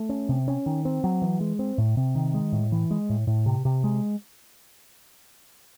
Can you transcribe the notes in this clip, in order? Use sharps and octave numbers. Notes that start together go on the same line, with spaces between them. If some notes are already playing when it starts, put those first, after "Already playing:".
Already playing: A3
C#4
C3
C#4
D#3
C4
F#3
E3
G#3
C4
A2
C3
D#3
G#3
A2
E3
G#3
A2
A2
C3
C3
G#3